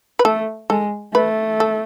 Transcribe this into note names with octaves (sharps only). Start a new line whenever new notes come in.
B4
A3 A4
G#3 A4
A3 B4
A4